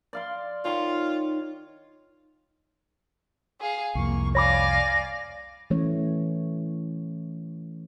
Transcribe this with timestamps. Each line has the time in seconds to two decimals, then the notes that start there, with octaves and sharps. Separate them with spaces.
0.13 D5 F5 C6
0.65 D#3 F4 C#5
3.61 G#4 F5
3.95 C2 F2 A#3 C#6
4.35 C#5 D5 F5 G#5 B5 D6 A#6
5.70 E3 A3 C#4 C#5